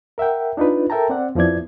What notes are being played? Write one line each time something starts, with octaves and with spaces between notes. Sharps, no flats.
A#4 E5 F#5 G5
D4 D#4 F4 B4
A4 A#4 E5 G5 A5 A#5
C4 D5 F#5
F2 F3 B3 E4 D5 G#6